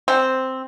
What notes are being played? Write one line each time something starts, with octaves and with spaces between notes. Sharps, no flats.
C4